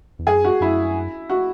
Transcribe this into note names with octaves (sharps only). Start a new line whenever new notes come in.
E2
F#2 G#4
F#4
F#2 E4
F#4